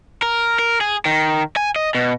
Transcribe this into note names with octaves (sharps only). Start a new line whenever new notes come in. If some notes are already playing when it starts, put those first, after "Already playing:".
A#4
A#4
G#4
D#3
G#5
D#5
B2